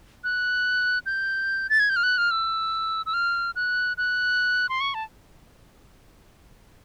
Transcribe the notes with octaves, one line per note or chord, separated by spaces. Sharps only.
F#6
G6
A6
G#6
G6
F6
F#6
F6
E6
E6
F6
F#6
F#6
C6
C#6
A5